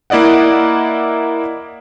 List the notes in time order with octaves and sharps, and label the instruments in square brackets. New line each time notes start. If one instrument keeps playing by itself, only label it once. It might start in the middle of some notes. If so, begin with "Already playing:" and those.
[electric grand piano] A#3 E4 D5 D#5 F#5